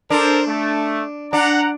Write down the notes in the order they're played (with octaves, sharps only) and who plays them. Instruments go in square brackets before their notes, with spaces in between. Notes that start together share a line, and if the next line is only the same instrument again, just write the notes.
[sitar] D4 [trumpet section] A4 A#4 C5
[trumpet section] A3
[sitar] D4 [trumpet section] F#5 A#5